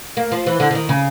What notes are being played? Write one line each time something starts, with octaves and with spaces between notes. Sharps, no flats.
A#3
F3
E3
D3
D3
D#3
C#3